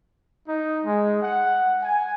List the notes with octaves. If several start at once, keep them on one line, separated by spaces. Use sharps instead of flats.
D#4
G#3
F#5
G#5